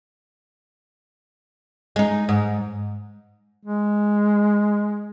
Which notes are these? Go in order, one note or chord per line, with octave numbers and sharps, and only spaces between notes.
G#3 D#4
G#2
G#3